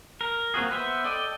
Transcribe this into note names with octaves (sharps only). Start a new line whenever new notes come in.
A#4
A#3 C4 F4 F#4 G#4
B3 B4 C5 E5
A4 D5 D#5 G5